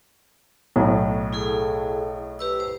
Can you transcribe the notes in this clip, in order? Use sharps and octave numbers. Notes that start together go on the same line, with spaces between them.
B1 A2
E4 G#4 A4
G4 B4 E6
C5